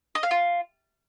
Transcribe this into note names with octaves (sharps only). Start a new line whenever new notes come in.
D#5
F5
F4